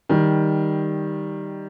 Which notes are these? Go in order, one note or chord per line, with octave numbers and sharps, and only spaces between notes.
D#3 G3